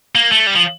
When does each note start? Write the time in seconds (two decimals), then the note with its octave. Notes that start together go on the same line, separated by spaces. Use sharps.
0.15 A#3
0.32 A3
0.47 G3
0.55 F3